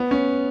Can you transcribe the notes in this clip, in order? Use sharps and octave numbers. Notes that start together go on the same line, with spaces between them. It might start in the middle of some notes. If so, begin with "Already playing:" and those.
Already playing: B3
C#4